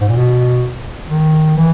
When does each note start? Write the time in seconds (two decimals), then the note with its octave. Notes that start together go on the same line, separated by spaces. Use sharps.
0.01 G#2
0.08 A#2
0.16 B2
1.09 D#3
1.57 E3